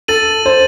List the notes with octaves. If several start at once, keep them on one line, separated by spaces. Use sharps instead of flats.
A4 A6 D#7 F#7
C5